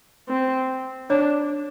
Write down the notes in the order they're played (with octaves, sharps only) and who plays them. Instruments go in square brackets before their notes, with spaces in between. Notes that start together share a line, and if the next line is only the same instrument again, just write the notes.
[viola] C4
[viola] D4 [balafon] C#5